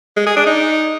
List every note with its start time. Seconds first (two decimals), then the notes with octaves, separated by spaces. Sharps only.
0.17 G#3
0.27 G#4
0.36 D4
0.46 D#4